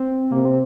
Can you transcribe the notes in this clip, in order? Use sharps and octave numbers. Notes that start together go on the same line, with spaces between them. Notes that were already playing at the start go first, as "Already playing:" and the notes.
Already playing: C4
C3 A#3
C4